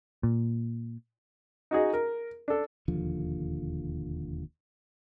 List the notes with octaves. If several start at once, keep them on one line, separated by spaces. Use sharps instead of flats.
A#2
D#4 F#4 G#4 D#5
A#4
D4 A4
E1 D#2 D3 F3